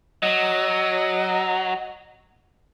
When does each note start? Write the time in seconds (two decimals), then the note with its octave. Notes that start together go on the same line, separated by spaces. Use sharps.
0.23 F#3 D#5